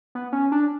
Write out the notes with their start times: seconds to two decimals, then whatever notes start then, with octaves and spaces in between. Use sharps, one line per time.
0.15 B3
0.33 C#4
0.52 D4